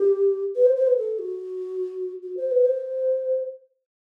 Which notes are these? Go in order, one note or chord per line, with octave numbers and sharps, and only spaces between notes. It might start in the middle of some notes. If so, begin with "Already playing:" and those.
Already playing: G4
B4
C5
C5
B4
A4
F#4
F#4
C5
B4
C5